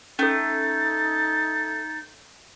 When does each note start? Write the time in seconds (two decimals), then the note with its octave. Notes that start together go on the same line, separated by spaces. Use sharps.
0.19 A3 C#4 D#4 A4 A6